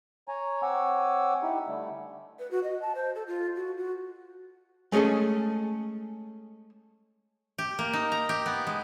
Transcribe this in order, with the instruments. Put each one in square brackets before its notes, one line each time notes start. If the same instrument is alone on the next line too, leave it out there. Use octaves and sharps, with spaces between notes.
[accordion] C#5 G#5 A#5
C4 C#5 F#5 G#5 D6 E6
D#4 E4 G4
D3 G3 A3
[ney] B4
F#4
D#5
A5
C5
A4
F4
F#4
F#4
[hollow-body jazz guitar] G#3 A3 C#4 G#4 A4
[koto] G4
A#3
D#4
A#5
G4
B3
G#3